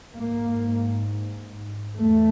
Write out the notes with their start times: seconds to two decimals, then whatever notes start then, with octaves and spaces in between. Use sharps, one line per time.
0.15 G#2 A#3
1.99 E2 A3